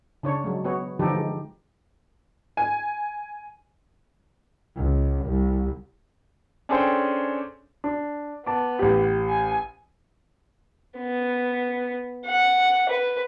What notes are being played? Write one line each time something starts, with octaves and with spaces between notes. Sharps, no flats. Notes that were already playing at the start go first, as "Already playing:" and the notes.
C#3 D4 C#5
F#3 G#3
B3 F#4 C#5
D3 E3 F3 D#4 G4 A4
G#3
G#5
C#2
C2
C#4 D4 G#4 A4 C5 G5
D4
B3 A5 D6
A1 G4
G#5
B3
F#5
B4